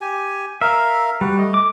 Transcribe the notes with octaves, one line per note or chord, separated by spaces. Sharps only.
G4 G#5
A#4 E5 F5
G3 F#4 B4
A3 D#5
D6